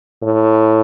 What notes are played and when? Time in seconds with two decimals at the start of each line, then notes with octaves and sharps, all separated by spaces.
0.23 A2